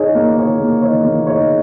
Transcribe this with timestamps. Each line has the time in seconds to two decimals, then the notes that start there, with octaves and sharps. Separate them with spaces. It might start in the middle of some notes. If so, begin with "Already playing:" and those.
Already playing: D#4 G#4 C#5
0.15 A#3
0.37 D#4 G#4 C#5
0.60 A#3
0.82 D#4 G#4 C#5
1.04 A#3
1.27 D#4 G#4 C#5